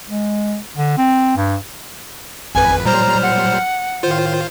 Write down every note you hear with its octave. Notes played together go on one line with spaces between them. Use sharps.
G#3
D3
C4
G2
G#1 F2 B4 G#5
A#2 F#3 G3 C5 A#5 F6
F#5
A2 D#3 F4 C5